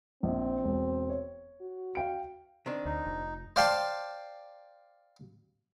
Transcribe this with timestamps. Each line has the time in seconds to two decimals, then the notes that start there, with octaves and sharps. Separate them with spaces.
0.23 A#1 C4
0.64 E1
1.10 C#5
1.61 F#4
1.95 F5 G5 D7
2.66 D#3 C4 D4
2.85 D2 D#4
3.06 F1
3.56 C5 D5 F5 G5 A5 C6